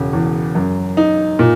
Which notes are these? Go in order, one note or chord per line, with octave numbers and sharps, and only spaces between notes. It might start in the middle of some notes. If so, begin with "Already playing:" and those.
Already playing: E1 C#3
E2
F#2
D#4
A#2